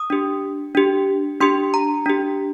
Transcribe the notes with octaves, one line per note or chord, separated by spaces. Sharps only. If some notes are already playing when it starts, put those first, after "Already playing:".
Already playing: D#6
D4 G4
D4 G4
D4 G4 C6
A#5
D4 G4